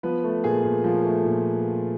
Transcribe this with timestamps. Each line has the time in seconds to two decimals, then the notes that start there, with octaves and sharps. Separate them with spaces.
0.03 F3 B3 B4
0.24 A3
0.44 A#2 G#4
0.64 A#2
0.84 F3
1.04 A3
1.25 A#2